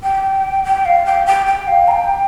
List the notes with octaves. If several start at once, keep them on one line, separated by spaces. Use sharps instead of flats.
G5
G5
F5
G5
G5
G5
F5
A#5
G5